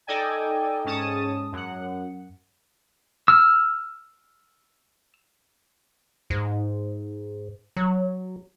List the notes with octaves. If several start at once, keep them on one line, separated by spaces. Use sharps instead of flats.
D#4 A4 D5 D#5 G5 G#5
G#2 C#4 A5 D#6
F#2 F#5
E6 F6
G#2
F#3